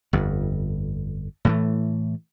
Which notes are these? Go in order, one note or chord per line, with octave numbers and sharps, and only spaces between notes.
G1 F2
A2 E3 A3